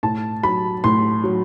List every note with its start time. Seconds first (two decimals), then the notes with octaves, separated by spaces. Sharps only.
0.03 A2 A5
0.43 F#3 B5
0.84 A2 C6
1.24 F#3